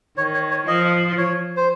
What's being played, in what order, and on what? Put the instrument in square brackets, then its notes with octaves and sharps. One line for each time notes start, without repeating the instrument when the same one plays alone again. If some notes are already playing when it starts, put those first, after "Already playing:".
[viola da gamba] D#3 [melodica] C#5
[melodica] C#5
C#5
[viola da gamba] F3 [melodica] D#5
[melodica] C#5
C5